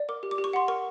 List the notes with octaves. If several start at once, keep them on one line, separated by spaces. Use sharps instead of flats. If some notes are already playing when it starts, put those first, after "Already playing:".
Already playing: D5
A#4 D6
G4
D6
G4
C#6
F#5 C6
A#4 C#6